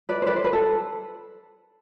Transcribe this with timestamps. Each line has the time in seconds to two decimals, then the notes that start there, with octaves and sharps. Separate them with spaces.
0.09 B4 D5
0.22 C5
0.26 B4 D5
0.36 C5
0.44 B4
0.53 A4